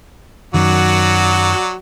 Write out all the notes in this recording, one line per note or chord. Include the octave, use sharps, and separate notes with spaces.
F#2 D#3 F#3 F#4 D5